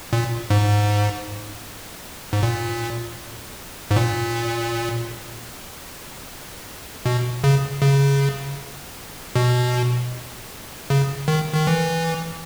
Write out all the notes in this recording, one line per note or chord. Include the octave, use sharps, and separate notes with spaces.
A#2
G#2
G#2
A#2
G#2
A#2
B2
C#3
C#3
B2
C#3
D#3
D#3
E3